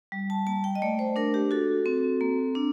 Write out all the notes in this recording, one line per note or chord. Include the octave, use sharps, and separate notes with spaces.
G3
A5
A#3 A5
G5
D#5
A3 D5
C5
D4 A#4
G4
F#4 A4
C4
A#3
D4